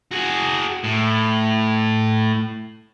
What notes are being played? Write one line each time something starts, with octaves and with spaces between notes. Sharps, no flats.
F#4 G#4
A2